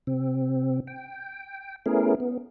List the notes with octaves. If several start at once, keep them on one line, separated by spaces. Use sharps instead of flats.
C3 C4
G5
A3 B3 C#4 E4 G#4 A#4
B3